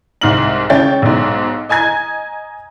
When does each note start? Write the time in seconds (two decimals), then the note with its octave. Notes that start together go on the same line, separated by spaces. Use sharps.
0.21 C2 G#2 F6 F#7
0.70 C#3 C#5 G5 A6
1.02 B1 G#2
1.69 D#5 G#5 A#5 G#6